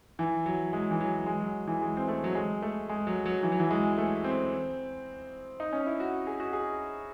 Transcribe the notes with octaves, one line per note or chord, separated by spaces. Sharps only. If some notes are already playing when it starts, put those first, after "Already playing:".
E3
F#3
G#3
E3
F#3
G#3
F#3
E3
G#3
C4
A3
F#3
G#3
A3
G#3
F#3
F#3
E3
F#3
E3
G#3
A3
C4
D#4
C#4
E4
F#4
G#4
F#4
G#4